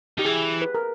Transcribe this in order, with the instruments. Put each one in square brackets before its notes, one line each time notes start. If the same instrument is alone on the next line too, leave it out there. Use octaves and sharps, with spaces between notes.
[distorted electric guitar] D#3 [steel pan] G4
[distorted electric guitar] E3 [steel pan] G#4
[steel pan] B4
A#4